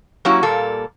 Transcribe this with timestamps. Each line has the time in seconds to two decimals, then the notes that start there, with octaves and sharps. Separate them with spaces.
0.25 F#3 A#3 C#4 E4 F#4 G4
0.43 A#2 G3 A#3 A4